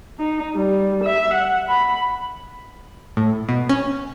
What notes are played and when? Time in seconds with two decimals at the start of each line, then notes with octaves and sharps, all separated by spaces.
0.20 D#4
0.56 G3
1.04 E5
1.34 F#5
1.68 B5
3.17 A2
3.49 B2
3.69 C#4